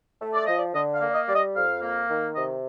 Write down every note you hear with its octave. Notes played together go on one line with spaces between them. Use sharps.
A3
D5
F3 D#5
D5
D3 D#5
F5
A#3
D5
D#5
G3 D5
D#5
F2 F5
A#3
D#3
C3 D#5